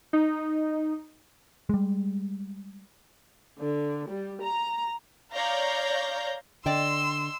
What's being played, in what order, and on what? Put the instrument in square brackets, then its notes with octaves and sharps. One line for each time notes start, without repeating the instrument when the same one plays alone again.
[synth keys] D#4
[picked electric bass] G3 G#3
[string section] D3
G3
A#5
[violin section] C#5 D5 F5 A#5 G6 A#6
[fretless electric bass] D3 [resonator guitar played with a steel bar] D5 D#5 G5 [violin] C6 E6